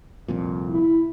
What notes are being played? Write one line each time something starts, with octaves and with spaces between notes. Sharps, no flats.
C2 F2 A#2
E4